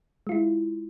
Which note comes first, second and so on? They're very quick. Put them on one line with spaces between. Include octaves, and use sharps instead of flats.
G#3 F4 E4